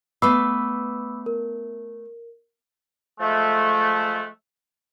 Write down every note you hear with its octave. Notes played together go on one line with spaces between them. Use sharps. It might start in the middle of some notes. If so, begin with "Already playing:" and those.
A3 B3 F5 B5 D6 E6
A#4
F3 G#3 A3